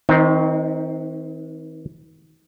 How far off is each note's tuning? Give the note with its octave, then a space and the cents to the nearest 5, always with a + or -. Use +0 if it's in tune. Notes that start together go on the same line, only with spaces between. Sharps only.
D#3 +45 C4 +0 D#4 +0